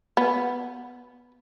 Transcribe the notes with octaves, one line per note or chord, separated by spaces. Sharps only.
B3